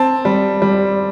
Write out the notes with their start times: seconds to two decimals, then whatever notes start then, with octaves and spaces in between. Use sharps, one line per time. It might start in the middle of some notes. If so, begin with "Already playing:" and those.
Already playing: C4 A5
0.25 G3
0.62 G3